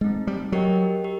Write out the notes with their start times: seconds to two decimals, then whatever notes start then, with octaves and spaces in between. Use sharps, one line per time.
0.01 G#3 A3 C4 D#4
0.27 G3
0.52 F#3 G4 A#4 D#5 G5
1.04 G4 A#4